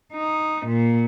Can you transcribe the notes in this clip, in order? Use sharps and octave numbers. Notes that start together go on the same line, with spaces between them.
D#4
A#2